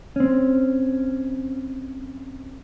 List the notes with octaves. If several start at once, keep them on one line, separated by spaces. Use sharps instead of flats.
C4 C#4